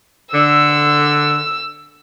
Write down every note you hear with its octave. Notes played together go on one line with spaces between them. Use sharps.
D3 E6